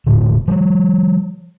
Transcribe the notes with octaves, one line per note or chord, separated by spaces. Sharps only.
E1 A2 D3
F3 G3